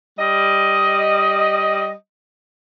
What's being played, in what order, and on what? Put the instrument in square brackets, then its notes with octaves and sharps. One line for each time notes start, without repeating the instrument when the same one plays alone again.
[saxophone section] G3 D#5